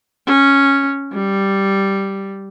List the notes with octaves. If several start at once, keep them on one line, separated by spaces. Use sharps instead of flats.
C#4
G3